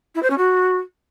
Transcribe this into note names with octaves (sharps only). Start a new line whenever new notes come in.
E4
C5
C#4
F#4